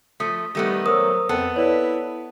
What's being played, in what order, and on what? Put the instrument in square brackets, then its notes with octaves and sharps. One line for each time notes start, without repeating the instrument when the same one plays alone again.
[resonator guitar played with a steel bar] F3 A3 [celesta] D#6 B6
[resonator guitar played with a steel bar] D#3 A3 B3 [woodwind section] G3 G4
[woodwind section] F#3 [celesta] A#4 C5 E6 [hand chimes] D#6
[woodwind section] F2 C4 [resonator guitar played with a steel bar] B3 A4
[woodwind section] E4 B4 [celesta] C#5 D5